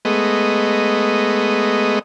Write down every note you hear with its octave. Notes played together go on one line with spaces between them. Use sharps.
G#3 A3 B3 D#5